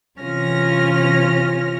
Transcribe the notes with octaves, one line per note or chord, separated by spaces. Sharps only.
C3 E3 C#4 F4 F6 A#6